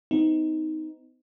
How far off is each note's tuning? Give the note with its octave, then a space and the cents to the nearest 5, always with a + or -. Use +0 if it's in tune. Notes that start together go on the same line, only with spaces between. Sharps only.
C4 -45 D#4 +10